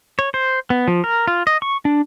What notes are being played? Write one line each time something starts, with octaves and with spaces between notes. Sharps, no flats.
C#5
C5
B3
F3
A#4
F4
D#5
C#6
D4